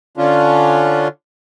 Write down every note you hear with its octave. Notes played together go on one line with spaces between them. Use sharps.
D3 C#4 D4 F4